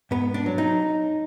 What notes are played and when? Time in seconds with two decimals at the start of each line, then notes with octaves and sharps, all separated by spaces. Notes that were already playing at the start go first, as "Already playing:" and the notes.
0.11 G#2 B3
0.34 D4
0.46 F#3
0.58 D#4